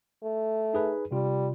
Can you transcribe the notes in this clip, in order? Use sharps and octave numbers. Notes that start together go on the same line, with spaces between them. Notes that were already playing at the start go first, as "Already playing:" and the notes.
A3
D#4 G#4 B4
C3 G3 F4